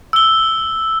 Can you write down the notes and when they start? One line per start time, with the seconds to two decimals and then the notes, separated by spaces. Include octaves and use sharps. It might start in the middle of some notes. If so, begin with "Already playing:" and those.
0.13 E6 G7